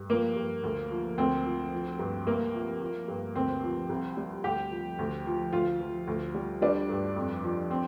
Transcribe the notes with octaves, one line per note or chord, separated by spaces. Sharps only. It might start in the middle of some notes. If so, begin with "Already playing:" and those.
Already playing: G2
F3 A#3
G2
D2
F3
D2 C4
F3
F3
G2
C2 A#3
F3
F3
G2
D2 C4
F3
C2
G3
D2 G4
F3
D2
F3
D2 F4
F3
D2
G3
G3 D4
G2
F2
F3
C4